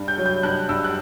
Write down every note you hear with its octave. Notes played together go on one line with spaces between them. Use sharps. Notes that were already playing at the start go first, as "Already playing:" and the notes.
Already playing: G2
G6
F#3
G6
G2 F#6
G2 E6
F#6